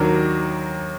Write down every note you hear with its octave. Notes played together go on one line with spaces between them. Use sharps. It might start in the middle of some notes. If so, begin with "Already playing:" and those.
Already playing: D#2 D#3 F#3 D4 A#4